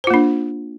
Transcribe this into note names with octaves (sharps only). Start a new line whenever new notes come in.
A#3 D4 F4 C5